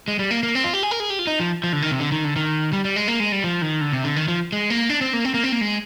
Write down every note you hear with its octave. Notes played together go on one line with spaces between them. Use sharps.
G#3
G3
A#3
A#3
C4
F4
G4
G#4
A#4
G#4
G4
F4
D#4
F3
F3
D3
D#3
C3
D3
D#3
D3
D#3
G3
G3
G#3
A#3
G#3
G3
F3
D#3
D3
C3
D3
D#3
F3
G#3
A#3
D4
C4
A#3
C4
A#3
C4
A#3
G#3